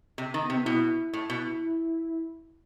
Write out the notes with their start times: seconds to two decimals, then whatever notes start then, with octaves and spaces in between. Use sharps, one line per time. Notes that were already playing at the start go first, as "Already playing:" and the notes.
0.18 C3
0.34 D#3
0.42 B3
0.50 C3 C4
0.57 B3
0.66 B2 E4
1.13 A2
1.30 B2